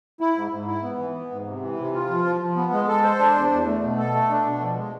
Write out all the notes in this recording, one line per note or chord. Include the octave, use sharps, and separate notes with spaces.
E4
G#2
G#2
E4
B3
E3
B3
G#2
C3
E3
C3
F4
F3
F3
F3
B3
G#3
A4
C5
D4
E2
E2
A3
B2
A4
A3
D4
B2
F3
G#3